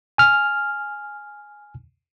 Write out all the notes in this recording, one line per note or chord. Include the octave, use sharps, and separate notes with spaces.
G#5 F6